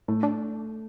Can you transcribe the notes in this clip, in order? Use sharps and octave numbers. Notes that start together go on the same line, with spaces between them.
A2 A3
D4